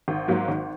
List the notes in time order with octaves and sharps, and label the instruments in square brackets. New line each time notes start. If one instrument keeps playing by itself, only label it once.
[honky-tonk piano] G#1
G#2 F#3 A#3
G#1